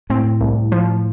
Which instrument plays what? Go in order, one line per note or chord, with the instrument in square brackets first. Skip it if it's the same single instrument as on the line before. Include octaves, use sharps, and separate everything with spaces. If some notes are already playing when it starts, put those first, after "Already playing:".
[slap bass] A2 [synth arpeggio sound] C4
[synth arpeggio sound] C2
F3